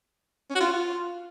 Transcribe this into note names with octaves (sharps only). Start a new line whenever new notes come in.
C#4
F#4
F4